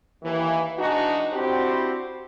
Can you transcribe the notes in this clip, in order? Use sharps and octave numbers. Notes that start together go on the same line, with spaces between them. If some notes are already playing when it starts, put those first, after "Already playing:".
D#2 E3
E3 G#3 D4 D#4 F#4
C4 D4 E4 F#4 G4 C5